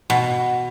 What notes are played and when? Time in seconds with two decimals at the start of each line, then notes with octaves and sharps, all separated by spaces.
0.10 B2